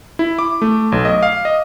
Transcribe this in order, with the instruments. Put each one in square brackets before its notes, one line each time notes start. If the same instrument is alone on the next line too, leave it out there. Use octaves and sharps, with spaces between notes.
[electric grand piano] E4
D6
A3
B1
D#5
F5
D#5